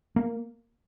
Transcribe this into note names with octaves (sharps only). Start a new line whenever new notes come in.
A#3